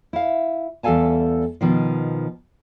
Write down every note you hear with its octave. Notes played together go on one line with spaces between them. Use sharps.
E4 F5
E2 G3 A4 F5 G#5 A5
B2 D#3 F3